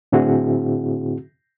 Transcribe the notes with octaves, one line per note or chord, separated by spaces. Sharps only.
A2 D3 C4 E4 F#4 G#4